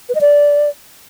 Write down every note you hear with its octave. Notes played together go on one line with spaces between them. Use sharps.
B4
D#5
D5